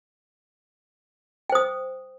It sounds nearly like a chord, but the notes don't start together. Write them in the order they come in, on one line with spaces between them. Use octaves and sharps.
G5 C5 D#6